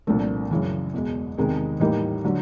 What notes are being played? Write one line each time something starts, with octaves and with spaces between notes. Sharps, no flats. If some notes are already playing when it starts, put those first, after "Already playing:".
C2 A#2 F3 A3 D4
F#2 C#3 E3
E2 B2 G#3
E2 C3 D#3 G#3
A2 E3 G3 A#3 D#4
D3 F#3